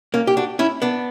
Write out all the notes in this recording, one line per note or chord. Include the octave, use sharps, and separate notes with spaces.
A#3 C#4
G4
D4 F#4
C#4 E4
B3 D4